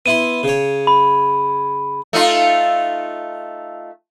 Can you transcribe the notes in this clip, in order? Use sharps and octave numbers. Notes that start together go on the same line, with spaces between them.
B3 E4 C6 D#7
C#3 C#5
B5
A3 D#4 F4